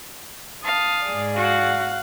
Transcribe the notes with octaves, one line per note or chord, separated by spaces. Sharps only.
F5 A5 D#6
G#2 G#4 D5
F#4 F5 F#5